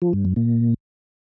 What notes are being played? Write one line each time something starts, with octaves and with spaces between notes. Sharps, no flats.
F3
G2
F#2
A#2